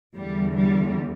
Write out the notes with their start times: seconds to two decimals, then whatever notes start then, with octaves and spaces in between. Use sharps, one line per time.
0.16 E2 D3 G3
0.56 G3